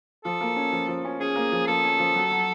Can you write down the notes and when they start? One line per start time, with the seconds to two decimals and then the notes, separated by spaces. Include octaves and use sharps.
0.25 F3 A4
0.41 A#3
0.56 C#4
0.72 F3
0.88 F3
1.05 C#4
1.20 C#4 G#4
1.36 A#3
1.52 F3
1.68 F3 A4
1.84 C#4
1.99 F3
2.16 F#3
2.31 F#3